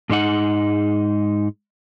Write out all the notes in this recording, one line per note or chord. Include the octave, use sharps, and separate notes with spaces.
G#2 G#3 D#4 F#5